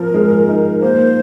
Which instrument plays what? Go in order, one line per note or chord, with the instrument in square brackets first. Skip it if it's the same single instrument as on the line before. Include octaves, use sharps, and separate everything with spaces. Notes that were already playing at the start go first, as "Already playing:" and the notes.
Already playing: [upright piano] F3 C4 [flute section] A#4
[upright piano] G#3
D#4
[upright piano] A#3 [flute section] C5